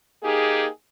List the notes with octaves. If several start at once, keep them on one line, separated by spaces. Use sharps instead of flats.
A#3 D#4 G4 G#4